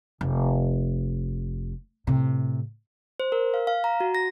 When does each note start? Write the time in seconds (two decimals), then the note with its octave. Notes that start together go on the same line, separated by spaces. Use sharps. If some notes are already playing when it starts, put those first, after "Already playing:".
0.21 F1
2.07 A2 C3
3.20 C5
3.32 A#4
3.54 F5
3.67 F5
3.84 A#5
4.00 F#4
4.15 A#6